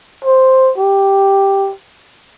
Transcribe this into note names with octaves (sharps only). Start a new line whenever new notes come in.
C5
G4